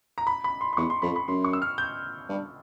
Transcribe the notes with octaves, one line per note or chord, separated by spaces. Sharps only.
A#5
B5
B5
C6
C6
E2 C#6
C6
F2 B5
B5
F#2 C6
C#6
E6
F6
G6
G2